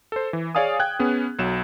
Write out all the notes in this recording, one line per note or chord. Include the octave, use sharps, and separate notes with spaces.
A4 C5
E3
G#4 C#5 D5 F5 G#5 D#6
G5 F#6 G#6
B3 C#4 G#4
B1 F#3 E7